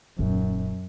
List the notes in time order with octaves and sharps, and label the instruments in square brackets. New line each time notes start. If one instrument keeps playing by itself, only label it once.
[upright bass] D#1 [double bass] F#2